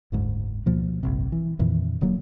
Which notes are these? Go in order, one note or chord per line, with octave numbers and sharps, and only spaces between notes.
F#1 D2 G#2
D2 B2 F3 A#3
F1 A#1 G2 C3
E3
F2 A#2 D#3 E3
D#1 D3 F#3 A#3